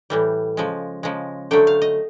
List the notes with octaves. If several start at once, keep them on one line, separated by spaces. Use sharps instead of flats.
A2 E3 G3
C#3 F3 G#3
C#3 F3 G#3
D3 F#3 A3 G5
F5
D#5